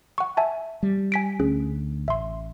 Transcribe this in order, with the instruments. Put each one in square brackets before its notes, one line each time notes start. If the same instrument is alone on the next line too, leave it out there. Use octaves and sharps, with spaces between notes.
[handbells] F#5 C#6
E5 G#5 A5
[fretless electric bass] G3
[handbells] G#5 B6 D7
[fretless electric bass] D2 [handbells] C#4 G#4
[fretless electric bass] A1 [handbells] E5 C6